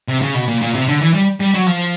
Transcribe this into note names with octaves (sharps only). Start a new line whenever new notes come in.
C3
C#3
B2
A#2
A#2
C3
D3
E3
G3
G3
F#3
F3